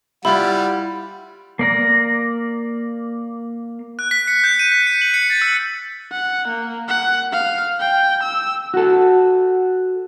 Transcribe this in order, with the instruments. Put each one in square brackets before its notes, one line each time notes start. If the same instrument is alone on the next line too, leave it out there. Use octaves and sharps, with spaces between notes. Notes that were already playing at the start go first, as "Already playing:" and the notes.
[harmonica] G3 [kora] E4 F4 [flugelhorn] F#5 [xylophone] B5
[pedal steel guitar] A#3 D5 A#5
[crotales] F#6
B6
C#7
G6
D#7
B6
C#7
F#7
C#7
A6
E6
[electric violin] F#5
A#3
F#5
F5
G5
E6
[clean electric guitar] F#4 A4